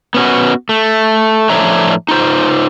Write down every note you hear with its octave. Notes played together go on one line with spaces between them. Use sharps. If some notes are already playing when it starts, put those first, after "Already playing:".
B3 C#4 F#4
A3
A2 F3 D4 C#5 E5 A#5
D#4 F4 C5